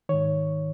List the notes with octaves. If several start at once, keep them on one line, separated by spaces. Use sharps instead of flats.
G#2 D#3 C#5